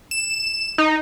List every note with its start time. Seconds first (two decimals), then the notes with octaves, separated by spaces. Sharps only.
0.11 E7
0.78 D#4